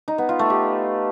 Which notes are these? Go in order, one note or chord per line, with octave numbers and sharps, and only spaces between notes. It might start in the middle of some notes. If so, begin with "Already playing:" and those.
D#4
B3
F4
A3
G4